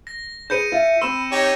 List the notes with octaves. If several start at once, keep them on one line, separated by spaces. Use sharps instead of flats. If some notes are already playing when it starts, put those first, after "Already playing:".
A#6
G#4 B4 C5 G6 C#7 D#7
F4 E5
C4 B5 C6 E6 E7
D#4 G4 C#5 A#6